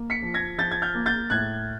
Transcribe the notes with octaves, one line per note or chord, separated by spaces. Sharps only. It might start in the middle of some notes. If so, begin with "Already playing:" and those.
Already playing: A#3
B6 C#7
F3
G#6 A#6
F3 G6 A6
G#6
F6 G6
A#3
G6 A6
A2 F#6 G#6